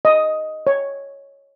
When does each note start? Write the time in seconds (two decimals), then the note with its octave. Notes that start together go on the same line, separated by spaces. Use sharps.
0.05 D#5
0.67 C#5